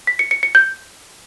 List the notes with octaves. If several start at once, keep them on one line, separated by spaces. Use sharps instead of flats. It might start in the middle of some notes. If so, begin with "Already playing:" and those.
B6
C#7
C#7
C#7
G6